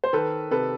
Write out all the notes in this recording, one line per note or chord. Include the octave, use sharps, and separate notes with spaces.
C5
D#3 A4 B4
C3 A4 B4